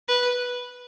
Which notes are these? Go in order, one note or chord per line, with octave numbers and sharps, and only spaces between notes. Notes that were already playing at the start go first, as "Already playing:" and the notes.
B4